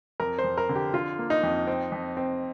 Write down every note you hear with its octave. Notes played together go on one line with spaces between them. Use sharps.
F2 A#4
C5
F2
A#4
D3
G4
D3 F4
A#3
D#4
F2
C4
F2
C4